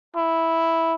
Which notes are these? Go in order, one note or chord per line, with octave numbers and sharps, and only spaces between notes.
E4